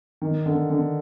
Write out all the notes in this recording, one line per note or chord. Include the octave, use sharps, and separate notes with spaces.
D#3
D3
D3